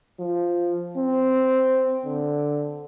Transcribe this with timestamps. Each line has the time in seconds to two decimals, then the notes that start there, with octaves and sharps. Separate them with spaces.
0.20 F3
0.97 C4
2.05 D3